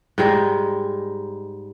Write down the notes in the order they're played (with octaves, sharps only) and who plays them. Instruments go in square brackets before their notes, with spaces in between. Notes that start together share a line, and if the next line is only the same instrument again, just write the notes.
[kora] G#2 G3 G#3